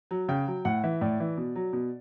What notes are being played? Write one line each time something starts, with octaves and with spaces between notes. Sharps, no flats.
F#3
C#3 G5
F#3
A2 F#5
E3 E5
A2 D5
E3
B2
F#3
B2